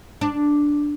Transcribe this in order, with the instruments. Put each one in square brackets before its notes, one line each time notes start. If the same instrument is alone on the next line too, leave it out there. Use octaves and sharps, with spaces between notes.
[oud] D4